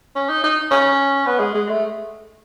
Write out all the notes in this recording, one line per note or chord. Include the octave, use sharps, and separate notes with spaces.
C#4
D#4
D#4
C#4
B3
G#3
G#3
A3